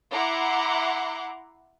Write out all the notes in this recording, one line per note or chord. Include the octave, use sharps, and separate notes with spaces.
E4 F#5 A#5 C6 D6